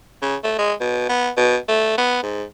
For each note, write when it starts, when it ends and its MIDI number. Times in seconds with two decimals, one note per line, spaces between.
0.22 0.36 49
0.44 0.55 57
0.58 0.73 56
0.81 1.08 47
1.09 1.30 59
1.37 1.57 47
1.69 1.95 57
1.98 2.22 59
2.23 2.44 44